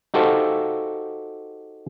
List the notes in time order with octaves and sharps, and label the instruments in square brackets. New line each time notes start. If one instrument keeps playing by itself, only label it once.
[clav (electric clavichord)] D#4 F#4 G4 A4 C5 F5